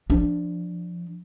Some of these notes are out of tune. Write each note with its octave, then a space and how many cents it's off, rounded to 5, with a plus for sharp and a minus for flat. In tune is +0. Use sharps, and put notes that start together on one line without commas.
F3 +0 D4 +0